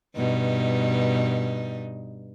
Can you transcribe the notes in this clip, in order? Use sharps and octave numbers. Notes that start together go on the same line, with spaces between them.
G2 B2 D#4